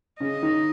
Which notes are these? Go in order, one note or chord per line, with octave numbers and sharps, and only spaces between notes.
C#3 C#4 D#5
D#3 D#4